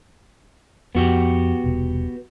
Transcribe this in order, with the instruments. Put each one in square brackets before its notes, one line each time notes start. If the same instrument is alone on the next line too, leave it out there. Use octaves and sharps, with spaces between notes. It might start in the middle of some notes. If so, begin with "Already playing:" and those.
[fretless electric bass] F2 [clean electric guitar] B3 F#4 G4
[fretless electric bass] E1 C2